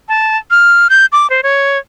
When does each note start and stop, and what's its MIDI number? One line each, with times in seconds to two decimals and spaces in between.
0.09 0.37 81
0.51 0.88 89
0.90 1.06 91
1.12 1.29 86
1.30 1.41 72
1.43 1.78 73